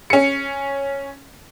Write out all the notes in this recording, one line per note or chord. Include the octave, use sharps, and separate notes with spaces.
C#4 C#7